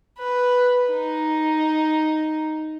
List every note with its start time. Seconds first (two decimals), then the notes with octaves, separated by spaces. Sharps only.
0.18 B4
0.91 D#4